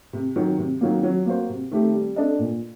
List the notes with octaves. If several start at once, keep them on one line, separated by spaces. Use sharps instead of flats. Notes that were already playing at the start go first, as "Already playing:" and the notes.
C3
D#3 F#3
C3
D#3 F#3 A#3
F#3
A#3 F#4 C5
C3
D#3 A3 C4 G4
G3
D4 A4 D#5
A#2